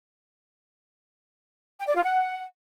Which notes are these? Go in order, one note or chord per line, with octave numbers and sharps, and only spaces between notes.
G5
D5
F4
F#5